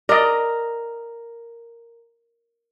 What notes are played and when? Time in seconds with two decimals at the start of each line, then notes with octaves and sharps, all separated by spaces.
0.09 A#4 D5 D#5